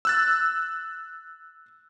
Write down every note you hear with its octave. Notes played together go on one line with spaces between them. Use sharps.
E6 F#6 A6